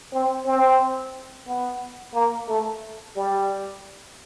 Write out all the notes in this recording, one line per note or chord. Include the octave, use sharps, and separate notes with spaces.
C4
C4
B3
A#3
A3
G3